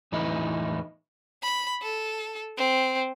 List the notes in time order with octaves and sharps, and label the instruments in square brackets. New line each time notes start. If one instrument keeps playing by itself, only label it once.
[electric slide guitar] E2 A2 E3 D#4 E4
[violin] B5
A4
C4